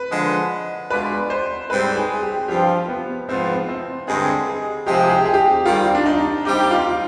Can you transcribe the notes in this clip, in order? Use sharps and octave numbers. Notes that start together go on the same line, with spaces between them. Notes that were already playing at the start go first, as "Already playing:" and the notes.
Already playing: B4
D3 F3 G#3
B2 G#3 D4 F4 B4
C5
G#2 G3 C4 B4
G#4
G4
G2 F3 C4 F4 G4
B3
G#2 F3 B3 C4 F4
C4
G2 D3 G#3 C4 G#4
G#4
C3 F3 G#3 C4 G4
G#4
G4
G#4
G4
G#4
G4
D#3 G3 C4 F4
D4
D#4
G3 C4 D#4 G4
F4